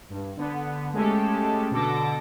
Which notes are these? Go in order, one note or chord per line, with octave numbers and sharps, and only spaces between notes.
G2
D3 B3
G#3 A3 C#4 G4 A4
B2 D3 A4 D6 A#6